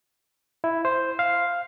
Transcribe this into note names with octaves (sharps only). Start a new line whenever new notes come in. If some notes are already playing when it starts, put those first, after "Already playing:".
E4
C5
F5